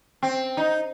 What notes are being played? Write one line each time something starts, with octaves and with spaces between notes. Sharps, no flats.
C4
D#4